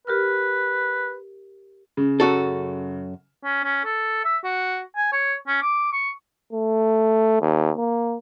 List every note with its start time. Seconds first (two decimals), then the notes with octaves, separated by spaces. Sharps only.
0.07 G4 A#4 B4 F6
1.97 C#3
2.20 F#2 F#4 A4
3.44 C#4
3.64 C#4
3.85 A4
4.25 E5
4.44 F#4
4.96 G#5
5.12 C#5
5.47 C#4
5.62 D6
5.93 C#6
6.53 A3
7.41 D#2
7.77 A#3